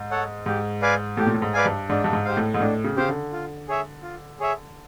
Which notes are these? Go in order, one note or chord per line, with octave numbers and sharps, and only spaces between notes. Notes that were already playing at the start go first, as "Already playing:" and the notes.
Already playing: G#2
A4 C#5 F#5
G#2 G4
B4 D5 F5 G#5
A2 G4
A#2
A2
G#2
B4 D5 F5 G#5
G2
G#2 D4
G2
G#2
G4 C5 F5
A2
G#2
A2 D4
C#3
C#3 G4 C5 F5
D3
F4
G#4 C#5 E5
F4
G#4 C#5 E5